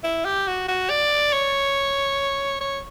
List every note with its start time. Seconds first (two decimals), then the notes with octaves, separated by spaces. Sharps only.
0.04 E4
0.25 G4
0.48 F#4
0.69 F#4
0.90 D5
1.33 C#5
2.61 C#5